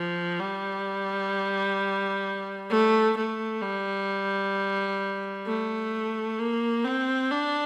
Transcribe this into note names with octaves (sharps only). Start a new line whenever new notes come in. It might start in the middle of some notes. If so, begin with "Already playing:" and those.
Already playing: F3
G3
A3
A3
G3
A3
A#3
C4
D4